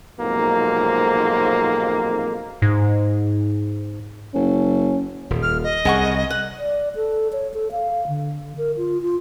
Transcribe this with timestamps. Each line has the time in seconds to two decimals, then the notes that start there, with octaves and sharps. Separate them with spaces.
0.19 B1 F2 G#2 C3 A#3
2.62 G#2
4.34 F#1 C#4
5.30 D#1
5.43 F6
5.63 D#5
5.85 C2 G#4 F#5 C#6
6.30 F#5
6.58 D5
6.95 A4
7.33 C#5
7.54 A4
7.72 F5
8.08 D3
8.58 A#4
8.77 F4
9.02 F4